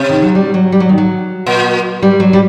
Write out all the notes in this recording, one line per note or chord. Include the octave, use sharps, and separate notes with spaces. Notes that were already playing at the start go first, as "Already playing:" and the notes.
Already playing: C3
D#3
F#3
G3
F#3
G3
F#3
D#3
F#3
A#2
G3
F#3
G3